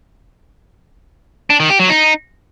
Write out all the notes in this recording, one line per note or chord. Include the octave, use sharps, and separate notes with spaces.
D4
D#3
G4
F#3
D#4